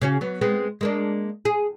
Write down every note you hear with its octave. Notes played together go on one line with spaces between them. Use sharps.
C#3 C#4 F#4
F#3 B3
G#3 B3 C4
G#3 A#3 D4
G#4